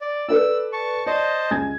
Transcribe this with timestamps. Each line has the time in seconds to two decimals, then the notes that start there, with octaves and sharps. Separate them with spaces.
0.01 D5
0.29 A4 B4 D5 E6
0.73 A5 C#6
1.06 C5 D5 D#5 A5
1.51 C#2 G#5 G#6